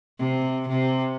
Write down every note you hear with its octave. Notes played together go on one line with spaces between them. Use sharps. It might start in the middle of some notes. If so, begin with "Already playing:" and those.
C3
C3